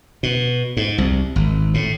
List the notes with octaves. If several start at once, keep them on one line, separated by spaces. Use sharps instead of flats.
B2
G#2
C2
G#1
A2